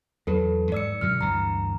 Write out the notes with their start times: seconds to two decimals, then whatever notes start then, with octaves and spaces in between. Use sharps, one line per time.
0.27 E2 F#3 A4 B4
0.72 G#2 D5 E6 C#7
1.01 F#2 B2 D3 F6 C#7
1.21 D2 G2 E3 A#5